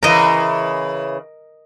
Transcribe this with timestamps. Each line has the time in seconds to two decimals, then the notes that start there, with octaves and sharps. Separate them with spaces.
0.03 C#3 E3 A#4 D#5